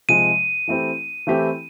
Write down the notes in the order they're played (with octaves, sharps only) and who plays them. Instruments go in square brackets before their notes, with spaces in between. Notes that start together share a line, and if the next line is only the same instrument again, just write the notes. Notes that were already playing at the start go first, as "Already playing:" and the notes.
[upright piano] C3 F3 G#3 [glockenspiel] D#7
[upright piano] E3 A3 C4 E4 G4
E3 A3 C4 E4 G4